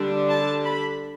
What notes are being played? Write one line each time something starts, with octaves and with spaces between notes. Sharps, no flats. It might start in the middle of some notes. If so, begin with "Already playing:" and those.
Already playing: D3 G3 D4
A5
B5